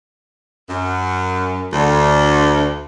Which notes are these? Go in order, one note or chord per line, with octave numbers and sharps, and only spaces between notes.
F#2
D2